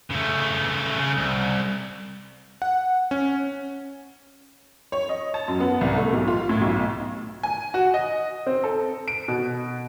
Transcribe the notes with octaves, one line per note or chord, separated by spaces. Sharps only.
C#3 A3
C#3
C2
F#5
C#4
C#5
D#5
A5
F#2
B3
C2
A3
B1
F4
A2
B1
G#5
F#4
D#5
C4
A4
D7
B2